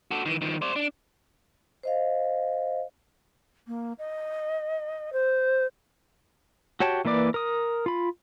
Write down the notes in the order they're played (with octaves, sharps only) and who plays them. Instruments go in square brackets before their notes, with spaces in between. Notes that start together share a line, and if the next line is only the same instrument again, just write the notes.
[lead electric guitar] F#4 A4
D#3 E3
D#3 F3
C5 D5
D4
[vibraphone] C5 D#5 F5
[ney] A#3
D#5
C5
[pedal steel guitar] F#4 G4 C#5 G5 A5
E3 A#3 B4 D5 D6
A#4 D#6
F4 B5